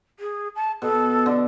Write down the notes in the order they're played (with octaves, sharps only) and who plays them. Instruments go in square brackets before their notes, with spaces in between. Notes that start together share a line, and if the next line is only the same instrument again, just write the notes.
[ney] G#4
A5
[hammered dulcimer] B2 [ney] A4
[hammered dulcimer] D3